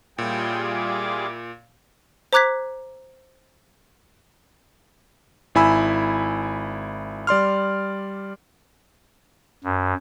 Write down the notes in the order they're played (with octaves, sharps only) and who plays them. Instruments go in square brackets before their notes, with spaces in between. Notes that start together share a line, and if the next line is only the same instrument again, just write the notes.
[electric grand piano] A#2 [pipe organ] G3 F4 G#4 [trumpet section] C#4 E4 G5
[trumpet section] E4 G4 D6
[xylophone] C5 A#5 D6 F#6 G#6 B6
[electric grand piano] G#1 E4 G#5 B5 E6
G3 D5 C6 F6
[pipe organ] F#2